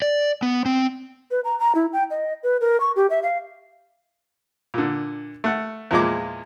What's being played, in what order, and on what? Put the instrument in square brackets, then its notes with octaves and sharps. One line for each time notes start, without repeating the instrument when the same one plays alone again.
[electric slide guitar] D5
B3
C4
[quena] B4
A#5
A#5
E4
G5
D#5
B4
A#4
C#6
G4
E5
F5
[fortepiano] A#2 D3
A3 F#5
E2 A#2 F3 G#3 A#3 D6